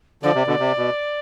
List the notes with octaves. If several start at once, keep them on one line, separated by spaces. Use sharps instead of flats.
D3 F3 D5
C3
B2 D3
C3
B2